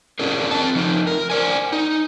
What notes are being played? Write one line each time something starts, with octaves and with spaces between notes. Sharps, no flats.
C#4 D4 F4 G#4 A#4
C4 A5
F3 D#4
A#4
C5 D5 G#5
D#4